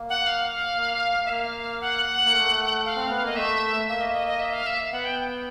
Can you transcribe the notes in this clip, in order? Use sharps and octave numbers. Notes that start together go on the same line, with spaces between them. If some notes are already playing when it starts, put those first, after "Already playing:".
Already playing: A#3
F#5
F5
A#3
E5
A#3 F5
F#5
A#3
A3
F5
C4
B3
A#3 D#5
A3 E5
A#3 E5
D#5
D#5
D#5
E5
F5
E5
B3 F#5
G5